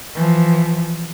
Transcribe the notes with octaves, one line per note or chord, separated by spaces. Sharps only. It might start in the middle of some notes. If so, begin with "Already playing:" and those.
E3 F3